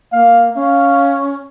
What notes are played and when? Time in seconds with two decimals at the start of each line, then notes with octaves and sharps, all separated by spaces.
0.12 A#3 F5
0.55 C#4 F5